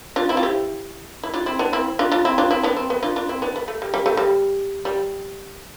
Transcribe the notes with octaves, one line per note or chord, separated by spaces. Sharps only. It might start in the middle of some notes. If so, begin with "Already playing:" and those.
D4 F4
C4 E4
F4
E4 G4
E4
D4 F4
C4 E4
B3 D4
C4 E4
D4 F4
D4 F4
C4 E4
D4 F4
C4 E4
B3 D4
C4
B3
D4 F4
D4 F4
C4 E4
B3 D4
B3
A3
G3
G3
A3
G3
G3